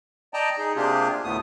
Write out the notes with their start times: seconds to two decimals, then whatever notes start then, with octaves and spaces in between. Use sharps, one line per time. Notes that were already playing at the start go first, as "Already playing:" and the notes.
0.34 D5 D#5 G5 A5 A#5
0.58 D#4 G#4
0.76 C3 A#3 D4 F4 G4 G#4
1.24 D2 A2 A3 B3 D#6